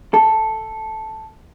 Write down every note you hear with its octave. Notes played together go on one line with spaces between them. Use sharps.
A4